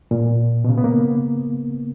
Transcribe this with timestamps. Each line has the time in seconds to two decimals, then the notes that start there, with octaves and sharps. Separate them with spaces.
0.11 A#2
0.64 B2
0.69 C#3
0.78 B3
0.84 A#3